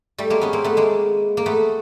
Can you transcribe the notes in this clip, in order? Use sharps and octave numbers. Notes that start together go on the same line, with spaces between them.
G3 A3
G#3 A#3
B3 C#4
A#3 C4
A3 B3
G#3 A#3
A#3
A3 B3